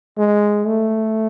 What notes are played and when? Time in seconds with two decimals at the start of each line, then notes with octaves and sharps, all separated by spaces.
0.18 G#3
0.67 A3